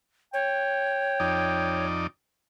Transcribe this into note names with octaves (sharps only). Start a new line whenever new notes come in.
C#5 G5
F2 D#4 D5